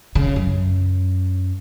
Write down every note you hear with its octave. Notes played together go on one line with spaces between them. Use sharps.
C#3
F#2